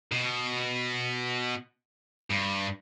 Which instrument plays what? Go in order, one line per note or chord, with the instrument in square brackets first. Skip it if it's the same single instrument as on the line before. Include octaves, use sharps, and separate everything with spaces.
[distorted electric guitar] B2
G2